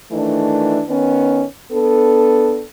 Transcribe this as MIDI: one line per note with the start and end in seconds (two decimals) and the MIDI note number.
0.11 0.81 51
0.11 0.81 52
0.11 0.81 57
0.11 0.81 62
0.88 1.43 51
0.88 1.43 59
0.88 1.43 61
1.72 2.62 59
1.72 2.62 62
1.72 2.62 69